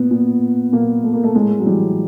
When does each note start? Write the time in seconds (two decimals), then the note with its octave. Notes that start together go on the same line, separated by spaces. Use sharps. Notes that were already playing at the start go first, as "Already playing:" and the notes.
Already playing: A#2 B3
0.11 A#2
0.72 A#2 A#3
1.03 A3
1.13 A#3
1.23 A3
1.35 A2 G#3
1.60 F#3
1.66 E3 G3